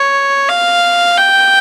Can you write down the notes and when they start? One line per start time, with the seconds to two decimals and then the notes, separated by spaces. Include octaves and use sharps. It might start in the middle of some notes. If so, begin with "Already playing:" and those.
Already playing: C#5
0.49 F5
1.17 G5